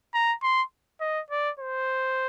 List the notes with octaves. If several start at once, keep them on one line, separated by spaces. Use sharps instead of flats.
A#5
C6
D#5
D5
C5